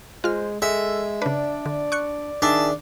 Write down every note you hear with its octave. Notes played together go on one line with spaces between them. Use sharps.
G#3 F4 C5 F6
G#3 A4 E5
C#3 D4 B4 D5
D3
C#6 F#6 C#7
D#3 D4 G#4 E5 A5